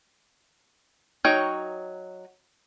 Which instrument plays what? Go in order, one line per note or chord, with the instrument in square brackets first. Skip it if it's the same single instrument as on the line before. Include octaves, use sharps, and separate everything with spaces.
[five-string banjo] F#3 D#4 C#5 G5